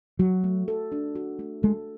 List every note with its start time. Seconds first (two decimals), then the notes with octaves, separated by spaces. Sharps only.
0.19 F#3 F#4
0.44 A3
0.68 A4
0.92 D4
1.15 F#4
1.39 A3
1.63 G#3 A4